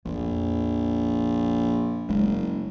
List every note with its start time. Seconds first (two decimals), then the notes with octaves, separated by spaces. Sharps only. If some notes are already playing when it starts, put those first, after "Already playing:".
0.05 A#1 F2
2.09 F#1 G#3